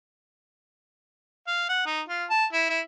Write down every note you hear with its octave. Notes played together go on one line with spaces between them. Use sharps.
F5
F#5
D#4
F4
A5
E4
E4